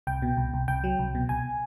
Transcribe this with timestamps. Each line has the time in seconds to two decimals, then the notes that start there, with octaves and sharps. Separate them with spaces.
0.07 C2 G5
0.22 B2
0.37 C2
0.54 C2
0.68 C2 G5
0.84 F#3
0.99 C2
1.15 B2
1.29 C2 G#5